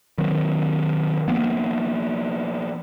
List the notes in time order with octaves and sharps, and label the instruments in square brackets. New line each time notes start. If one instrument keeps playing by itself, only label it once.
[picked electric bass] D#3 F#3 C4
F3 A#3 B3